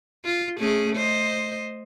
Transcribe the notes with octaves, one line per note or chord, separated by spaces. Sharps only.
F4
A3 C#4 G#4
C5 D#5